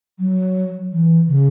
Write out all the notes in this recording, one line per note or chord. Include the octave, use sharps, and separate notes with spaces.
F#3
E3
C#3